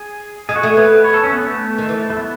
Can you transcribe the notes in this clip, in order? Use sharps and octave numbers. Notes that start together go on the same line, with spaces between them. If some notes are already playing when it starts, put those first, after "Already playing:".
Already playing: G#4
G#3 G#4
F#4
A3 G#4
B3 B4
C#5
A4
C#4
B3
A3
D#3
E3
A3
B3